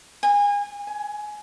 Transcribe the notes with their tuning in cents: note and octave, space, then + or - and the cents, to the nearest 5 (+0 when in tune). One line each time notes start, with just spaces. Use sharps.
G#5 -30
G#5 +15